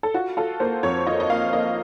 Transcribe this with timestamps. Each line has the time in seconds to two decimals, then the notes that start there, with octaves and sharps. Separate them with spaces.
0.03 A4
0.14 F4 F#4
0.37 F4 A4
0.60 A#3 C5
0.83 F2 C#5
1.07 F4 D#5
1.20 D#5
1.30 A#3 F5
1.53 A#3 D#5